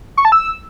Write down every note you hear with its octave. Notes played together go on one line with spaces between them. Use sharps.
C#6
A5
E6